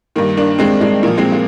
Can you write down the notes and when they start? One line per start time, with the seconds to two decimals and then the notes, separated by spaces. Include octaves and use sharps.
0.16 G2 D#3 A#3
0.37 A#3 D4
0.59 G#3 C4
0.81 G#3
1.03 A#2 F3 A#3
1.18 G#3 C4
1.32 G#3